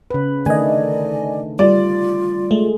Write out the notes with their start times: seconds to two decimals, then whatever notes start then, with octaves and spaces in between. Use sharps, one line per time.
0.11 C#3 B4
0.46 D3 D#3 A3 D5 D#5 G#5
1.59 G3 F4 D5
2.51 G#3 A3